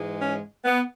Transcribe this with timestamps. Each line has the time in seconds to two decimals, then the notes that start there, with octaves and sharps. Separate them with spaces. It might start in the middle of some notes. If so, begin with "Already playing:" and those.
Already playing: G#2 E3 G#3
0.19 C#4
0.65 B3